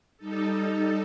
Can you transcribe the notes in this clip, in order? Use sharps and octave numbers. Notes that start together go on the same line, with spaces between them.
G3 D#4 A4